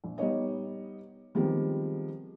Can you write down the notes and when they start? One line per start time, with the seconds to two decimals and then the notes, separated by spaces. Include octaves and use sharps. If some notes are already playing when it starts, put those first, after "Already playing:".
0.04 A#1
0.18 G3 B3 D#4 C#5 D#5
1.35 D#3 F3 G3 G#3 B3 C4